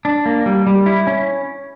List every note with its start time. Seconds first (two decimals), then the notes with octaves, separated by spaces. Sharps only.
0.05 D4
0.26 A#3
0.46 G3
0.67 G3
0.86 E4
1.07 C#4